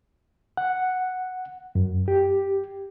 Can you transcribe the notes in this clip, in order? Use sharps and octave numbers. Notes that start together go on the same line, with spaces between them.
F#5
F#2
G4